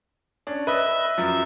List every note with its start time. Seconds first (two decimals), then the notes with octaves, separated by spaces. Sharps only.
0.47 C#4 D4
0.67 B4 D#5 E5
1.18 F#2 F3